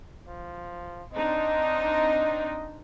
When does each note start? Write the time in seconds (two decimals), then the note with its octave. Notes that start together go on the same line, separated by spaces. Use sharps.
0.28 F3
1.13 C4 D4 D#4 D#5